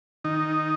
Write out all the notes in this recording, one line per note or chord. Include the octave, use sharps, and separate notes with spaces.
D#3 D#4